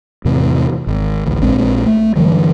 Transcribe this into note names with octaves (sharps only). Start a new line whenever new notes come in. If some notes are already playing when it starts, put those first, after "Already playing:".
E2 A2 C3
G#1
A1 D2
A#1 G#3 C4 D4
A3
G2 D3 E3 F#3